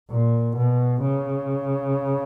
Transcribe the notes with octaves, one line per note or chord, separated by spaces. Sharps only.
A#2
B2
C#3